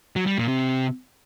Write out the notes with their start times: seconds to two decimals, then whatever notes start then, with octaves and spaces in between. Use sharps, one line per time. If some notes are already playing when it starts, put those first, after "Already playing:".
0.16 F#3
0.27 G3
0.37 A#2
0.48 C3